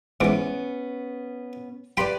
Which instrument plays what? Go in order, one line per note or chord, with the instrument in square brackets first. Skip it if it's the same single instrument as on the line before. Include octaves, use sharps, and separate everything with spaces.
[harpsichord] G#2 E3 D6 [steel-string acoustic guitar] B3 C#4
[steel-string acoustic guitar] G4 B4 D5 [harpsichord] G5 B5 C6